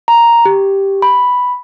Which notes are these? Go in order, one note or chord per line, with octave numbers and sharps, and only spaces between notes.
A#5
G4
B5